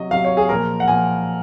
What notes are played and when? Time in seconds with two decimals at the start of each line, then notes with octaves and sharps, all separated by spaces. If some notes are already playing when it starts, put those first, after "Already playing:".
Already playing: C3 F#3 D#5
0.11 C3 F#3 F5
0.24 C#5
0.37 G#4
0.49 A#2 F3 A#4
0.80 F#5
0.88 A#2 F3 G#5